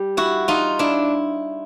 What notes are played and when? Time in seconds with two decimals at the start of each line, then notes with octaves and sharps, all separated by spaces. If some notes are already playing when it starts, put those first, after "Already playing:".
Already playing: G3
0.17 E4 F#4
0.48 D#4 F4
0.79 D4 E4